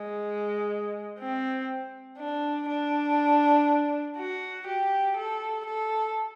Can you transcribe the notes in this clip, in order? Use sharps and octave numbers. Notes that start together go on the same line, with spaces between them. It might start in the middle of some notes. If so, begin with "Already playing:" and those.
Already playing: G#3
C4
D4
D4
F#4
G4
A4
A4